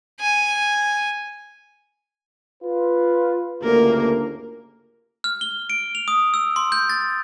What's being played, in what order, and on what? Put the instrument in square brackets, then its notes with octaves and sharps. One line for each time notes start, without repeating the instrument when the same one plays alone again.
[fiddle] G#5
[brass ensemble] F4 B4
[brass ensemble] G1 D2 C#3 [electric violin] A#3 A#4
[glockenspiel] F6
G7
D7
F7
D#6
E6
C6
G6
A6